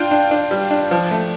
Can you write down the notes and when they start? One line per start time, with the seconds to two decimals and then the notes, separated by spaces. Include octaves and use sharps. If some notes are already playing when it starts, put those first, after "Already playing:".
Already playing: D4 F4 G5
0.11 D4
0.31 D4
0.51 G3
0.71 D4
0.91 F3
1.11 A3